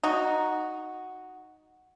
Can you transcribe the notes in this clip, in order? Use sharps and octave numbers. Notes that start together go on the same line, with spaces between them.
D#4 F#4